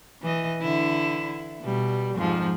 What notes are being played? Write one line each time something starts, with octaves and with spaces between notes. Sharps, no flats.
E3 D#5
D3 E4
B2 G3
F2 G#2 F3